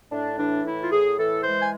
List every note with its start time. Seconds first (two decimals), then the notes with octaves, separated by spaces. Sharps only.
0.11 A2 D4
0.38 E3 D4
0.64 A2 E4
0.81 F4
0.91 A2 G#4
1.17 E3 A4
1.43 G#3 C5
1.61 G#5